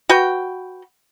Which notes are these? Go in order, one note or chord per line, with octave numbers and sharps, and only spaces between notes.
F#4 B4 G5